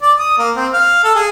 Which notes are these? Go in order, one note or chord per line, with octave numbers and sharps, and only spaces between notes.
D5
D#6
A#3
C4
F5
A4
G#4